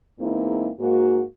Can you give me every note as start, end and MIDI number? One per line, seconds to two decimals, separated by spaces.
0.19 0.68 40
0.19 0.68 56
0.19 0.68 58
0.19 0.68 60
0.19 0.68 63
0.19 0.68 64
0.79 1.21 44
0.79 1.21 58
0.79 1.21 66